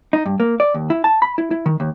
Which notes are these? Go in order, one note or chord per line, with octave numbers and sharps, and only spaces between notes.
D#4
G2
A#3
D5
D#2
E4
A5
B5
E4
E4
D#3
D#2